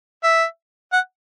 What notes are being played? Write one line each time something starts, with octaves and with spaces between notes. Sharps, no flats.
E5
F#5